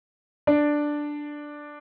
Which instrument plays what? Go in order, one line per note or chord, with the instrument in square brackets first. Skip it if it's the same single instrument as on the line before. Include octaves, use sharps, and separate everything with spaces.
[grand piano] D4 D5